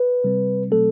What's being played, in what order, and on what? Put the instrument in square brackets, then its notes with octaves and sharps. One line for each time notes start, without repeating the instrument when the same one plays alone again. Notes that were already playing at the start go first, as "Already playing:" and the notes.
Already playing: [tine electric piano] B4
C3 G3 C4
B2 F#3 A3 C4 A4